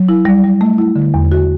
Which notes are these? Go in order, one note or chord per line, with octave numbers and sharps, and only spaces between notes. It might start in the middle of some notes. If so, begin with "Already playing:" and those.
Already playing: F#3
E4
G3
G3
A3
E4
D3
E2
F#4